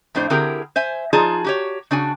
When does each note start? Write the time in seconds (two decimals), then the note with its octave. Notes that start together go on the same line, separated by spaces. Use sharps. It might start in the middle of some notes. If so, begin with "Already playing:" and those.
0.15 F2 A2 D4 C5
0.30 D3 C4 E4 G4 G#4 A#4
0.76 C5 E5 G#5
1.13 F3 D#4 F4 G#4 D5 A5
1.44 F#4 G4 C#5
1.91 C#3 D4 F#4 G#5